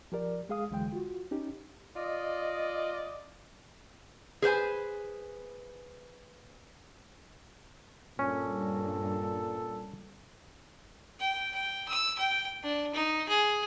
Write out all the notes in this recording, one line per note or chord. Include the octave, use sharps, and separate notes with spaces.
F3 G4 A#4 D5
G#3 G#4 F5 D#6
C2 D3 E3 F#3 G#3 G5
F4 F#4
C#4 D#4 G4
F4 D5 D#5
G#4 B4 C5 G#5
G2 A#2 C#4 A4
G5
G5
E6
G5
D4
D#4
G#4